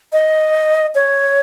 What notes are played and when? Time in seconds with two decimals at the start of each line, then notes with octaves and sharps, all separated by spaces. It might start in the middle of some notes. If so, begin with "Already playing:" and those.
0.12 D#5
0.95 C#5